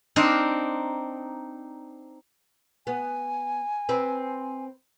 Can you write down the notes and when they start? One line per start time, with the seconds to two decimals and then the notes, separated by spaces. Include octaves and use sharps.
0.16 C4 D4 D#4 A#4 C5
2.87 B3 G#5
3.89 C4 B4